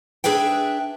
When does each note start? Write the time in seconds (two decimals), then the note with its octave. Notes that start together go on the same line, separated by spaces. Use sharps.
0.24 D4 G#4 B4 E5 G5